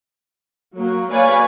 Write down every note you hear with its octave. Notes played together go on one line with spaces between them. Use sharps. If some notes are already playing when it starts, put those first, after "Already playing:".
F#3 A#3
B4 C#5 D5 F5 G#5